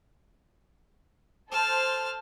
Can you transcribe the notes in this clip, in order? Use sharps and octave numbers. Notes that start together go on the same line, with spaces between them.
A4 C5 A5 F6